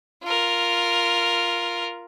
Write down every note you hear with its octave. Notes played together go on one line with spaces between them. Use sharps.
F4 A#4